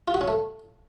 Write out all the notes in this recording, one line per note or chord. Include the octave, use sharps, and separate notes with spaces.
F4
F#4
C#4
A3